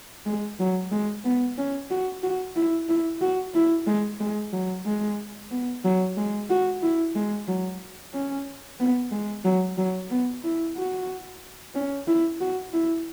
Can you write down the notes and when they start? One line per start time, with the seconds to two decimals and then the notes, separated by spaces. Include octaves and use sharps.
0.26 G#3
0.59 F#3
0.92 G#3
1.24 B3
1.58 C#4
1.91 F#4
2.23 F#4
2.56 E4
2.89 E4
3.21 F#4
3.54 E4
3.87 G#3
4.20 G#3
4.53 F#3
4.86 G#3
5.51 B3
5.84 F#3
6.17 G#3
6.50 F#4
6.83 E4
7.15 G#3
7.48 F#3
8.14 C#4
8.79 B3
9.12 G#3
9.45 F#3
9.78 F#3
10.11 B3
10.44 E4
10.77 F#4
11.75 C#4
12.07 E4
12.40 F#4
12.73 E4